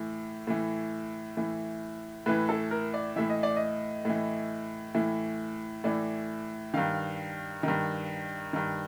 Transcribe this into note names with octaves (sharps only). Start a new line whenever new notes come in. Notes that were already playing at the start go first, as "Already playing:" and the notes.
Already playing: A2 E3
A2 E3
A2 E3
A2 E3 B4
A4
A#4
D5
A2 E3 E5
D#5
D5
D#5
A2 E3
A2 E3
A2 E3 D5
G2 D#3 F5
G2 D#3
G2 D#3